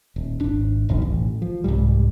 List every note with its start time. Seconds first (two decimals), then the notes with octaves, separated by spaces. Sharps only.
0.16 D#1
0.41 G#1 D4
0.89 E1 B1 F#2 D#3
1.02 A1
1.42 F3
1.64 C2 F2 G#2 G3